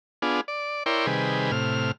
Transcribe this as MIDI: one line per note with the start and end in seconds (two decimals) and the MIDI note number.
0.22 0.41 59
0.22 0.41 62
0.22 0.41 65
0.22 0.41 68
0.48 0.83 74
0.86 1.06 64
0.86 1.06 70
0.86 1.06 73
0.86 1.06 74
0.86 1.06 79
0.86 1.06 84
1.07 1.51 48
1.07 1.51 51
1.07 1.51 55
1.07 1.51 68
1.07 1.51 71
1.51 1.91 45
1.51 1.91 48
1.51 1.91 89